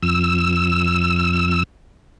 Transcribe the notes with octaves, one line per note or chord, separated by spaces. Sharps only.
F2 E6